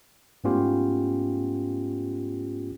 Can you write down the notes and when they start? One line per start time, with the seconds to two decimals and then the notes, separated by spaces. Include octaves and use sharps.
0.44 G#2 A3 B3 C#4 F4 G4